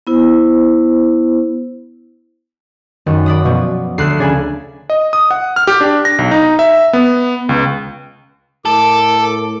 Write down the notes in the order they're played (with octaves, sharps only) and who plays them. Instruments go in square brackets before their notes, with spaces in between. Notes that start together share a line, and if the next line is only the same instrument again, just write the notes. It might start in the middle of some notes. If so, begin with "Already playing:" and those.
[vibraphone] B3 E4 C5
[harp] F#2 [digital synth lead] D#3
[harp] D5 B5 D#6
[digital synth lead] B2 [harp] F3 F#3
[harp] D2 F#6 [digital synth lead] C7
[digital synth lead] C#3 [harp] D4 G#5 B5
[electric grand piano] D#5
D#6
F#5
F6
G4
D4
A#6
B1
D#4
E5
B3
C#2
[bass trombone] A2 [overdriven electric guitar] A4 [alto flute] A#4 [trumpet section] D6